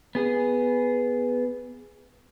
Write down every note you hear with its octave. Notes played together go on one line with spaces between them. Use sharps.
B3 G#4